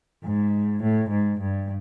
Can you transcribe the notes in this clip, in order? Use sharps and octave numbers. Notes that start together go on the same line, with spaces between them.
G#2
A2
G#2
G2